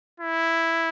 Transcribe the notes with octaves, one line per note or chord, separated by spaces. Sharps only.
E4